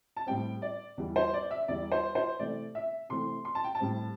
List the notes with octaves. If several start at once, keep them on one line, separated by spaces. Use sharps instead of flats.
A5
A2 G3 C4 G5
D5
E2 E3 G3
C5
D5
E5
E2 E3 G3 D5
C5
C5
C3 E3 A3 C4 D5
E5
C3 E3 A3 C4 C6
C6
A5
G5
A5
A2 G3 C4